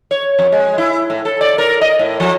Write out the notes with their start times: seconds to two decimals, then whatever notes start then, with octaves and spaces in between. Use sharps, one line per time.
0.11 C#5
0.39 F2
0.52 G#3
0.78 E4
1.10 A2
1.25 A4
1.41 D5
1.58 A#4
1.81 D#5
1.99 A2
2.20 F3